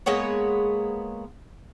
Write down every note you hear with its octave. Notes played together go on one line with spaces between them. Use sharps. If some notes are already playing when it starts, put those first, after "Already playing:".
G#3 A#3 B3 C#5